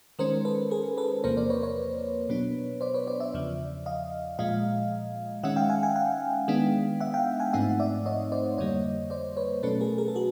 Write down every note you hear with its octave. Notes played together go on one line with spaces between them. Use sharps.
D#3 G#3 C#4 A#4 C5
A4 B4
G#4 A#4
A4 B4
E2 C3 F3 A#3 A#4 C5
C5 D5
B4 C#5
B4 C#5
B2 F#3 B3 D4
C5 D5
B4 C#5
C5 D5
D5 E5
E2 C#3 F3
D#5 F5
A#2 F3 G#3 D#5 F5
D#3 G#3 C#4 E5 F#5
F5 G5
F#5 G#5
F#5 G#5
F5 G5
D#3 G#3 B3 D4
E5 F#5
F5 G5
F#5 G#5
G#2 F3 A3 C4 D#4 E5 F#5
D5 E5
C#5 D#5
C5 D5
F2 D3 G3 A#3 C#5 D#5
C5 D5
B4 C#5
B2 F#3 A3 C#4 A4 B4
G#4 A#4
G#4 A#4
A4
F#4 G#4